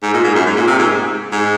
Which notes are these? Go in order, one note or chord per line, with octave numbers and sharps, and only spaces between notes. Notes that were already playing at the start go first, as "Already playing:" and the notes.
G#2
A#2
G#2
F#2
G#2
A#2
C3
G#2
G#2